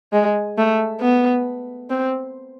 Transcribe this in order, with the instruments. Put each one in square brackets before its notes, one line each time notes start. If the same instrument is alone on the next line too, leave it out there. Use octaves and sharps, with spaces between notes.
[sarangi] G#3
A3
B3
C4